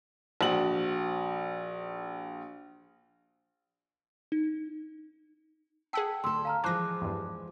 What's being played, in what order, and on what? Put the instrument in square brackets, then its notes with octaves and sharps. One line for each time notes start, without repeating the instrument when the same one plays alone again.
[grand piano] A#1 F#4 F#7
[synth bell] D#4
[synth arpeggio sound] G#4 F#5 B6 [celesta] G5 A5 E6
[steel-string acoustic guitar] D2 A4 [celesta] C6 E6
[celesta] F5 A#5 F6
[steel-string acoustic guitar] E3 F3 G#3 [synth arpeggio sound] C5 A#6 [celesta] A5 D6 F#6
[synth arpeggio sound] E2 G2